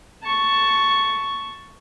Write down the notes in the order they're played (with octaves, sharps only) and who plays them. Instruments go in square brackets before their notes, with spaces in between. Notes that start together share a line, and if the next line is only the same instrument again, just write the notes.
[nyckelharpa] A5 C#6